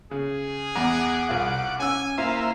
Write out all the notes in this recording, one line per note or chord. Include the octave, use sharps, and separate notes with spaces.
C#3 G#4
E2 F#5 A#5 D6
C2 F4
C#4 G#5 E6
A#3 E4 C5 E5 F5